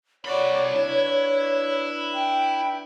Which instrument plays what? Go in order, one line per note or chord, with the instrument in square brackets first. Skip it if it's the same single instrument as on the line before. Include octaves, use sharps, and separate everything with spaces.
[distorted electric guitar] C3 B5 [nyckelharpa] F#4 D5 [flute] C#5
[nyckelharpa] D4 B4 [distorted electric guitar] E4
[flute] G5